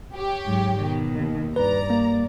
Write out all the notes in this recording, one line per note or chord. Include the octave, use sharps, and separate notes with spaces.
G4 C#5
G#2 F#3
B2 D#3
D#2
G2 B4 D5 A#5
A#3